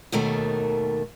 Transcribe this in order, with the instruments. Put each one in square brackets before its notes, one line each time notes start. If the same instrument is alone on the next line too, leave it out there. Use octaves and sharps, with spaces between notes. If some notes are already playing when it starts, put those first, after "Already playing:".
[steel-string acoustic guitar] D#2 B2 D#3 A3 A#3